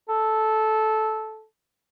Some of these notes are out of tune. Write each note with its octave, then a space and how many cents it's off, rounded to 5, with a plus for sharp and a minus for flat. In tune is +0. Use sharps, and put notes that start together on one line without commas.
A4 -10